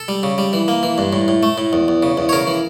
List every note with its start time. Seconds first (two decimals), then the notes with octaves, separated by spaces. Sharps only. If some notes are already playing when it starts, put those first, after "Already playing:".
Already playing: A4
0.08 G3
0.23 C#3
0.38 G3
0.53 E3
0.68 A#3
0.83 E3
0.98 G2
1.13 A2
1.28 A2
1.43 A3
1.58 A2
1.73 E2
1.88 E2
2.03 C#3
2.17 E2
2.29 C#5
2.33 C#3 A#4
2.47 E3